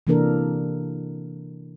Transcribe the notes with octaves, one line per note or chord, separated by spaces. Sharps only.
C3 E3 A#3 D4 A4 A#4